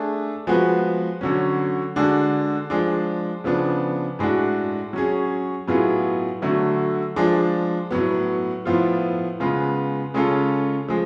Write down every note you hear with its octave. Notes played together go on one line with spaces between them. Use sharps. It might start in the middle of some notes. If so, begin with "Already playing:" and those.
Already playing: A3 D4 G#4
F3 G#3 B3 F#4 B4
D3 F#3 C#4
D3 G#3 D4 F#4
F3 G#3 D4
C#3 F3 B3 D4
A2 G#3 D4 F#4
F#3 C#4 G#4
A2 F#3 B3 F4 G#4
D3 F#3 A3
F3 G#3 D4
A2 F#3 B3
A2 F3 B3 F4
C#3 G#3 B3 F4 B4
C#3 G#3 C#4 F4 A4
F3 G#3